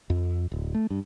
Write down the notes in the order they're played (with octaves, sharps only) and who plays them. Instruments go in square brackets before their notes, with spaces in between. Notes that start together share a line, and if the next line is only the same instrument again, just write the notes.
[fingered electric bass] F2
D1
A3
G2